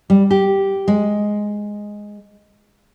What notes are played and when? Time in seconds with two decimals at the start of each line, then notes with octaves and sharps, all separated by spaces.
0.10 G3
0.31 G4
0.88 G#3